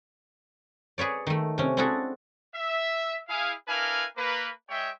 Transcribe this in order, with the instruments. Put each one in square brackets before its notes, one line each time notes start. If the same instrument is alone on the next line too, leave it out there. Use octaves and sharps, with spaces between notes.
[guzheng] G#4 B4 C#5 D5
D#3 A3
C3 C#4
C4 D4 E4 F#4 G#4 A4
[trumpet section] E5
E4 G#4 F5
D4 E4 A#4 B4 F5 G#5
A#3 B4
G#3 C#5 E5 G5